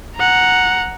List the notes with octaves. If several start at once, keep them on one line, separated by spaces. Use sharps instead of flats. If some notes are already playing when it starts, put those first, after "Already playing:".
F#5 A#5